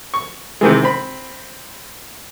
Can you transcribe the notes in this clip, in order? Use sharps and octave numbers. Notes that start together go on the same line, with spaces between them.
C#6
C3 D#3 E3 G#3
C4 B5